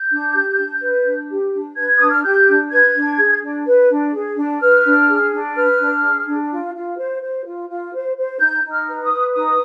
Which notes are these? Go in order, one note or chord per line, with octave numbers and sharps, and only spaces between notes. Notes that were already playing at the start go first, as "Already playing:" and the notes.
Already playing: G6
D4
G4
D4
B4
D4
G4
D4
B4 G#6
D4 D#6
F6
G4 G6
D4
B4 G#6
D4
G#4
D4
B4
D4
G#4
D4
B4 F6
D4
G#4
D4
B4 F6
D4
G#4
D4
F4
F4
C5
C5
F4
F4
C5
C5
D#4 G6
D#4
F6
B4
D#6
B4
D#4 D#6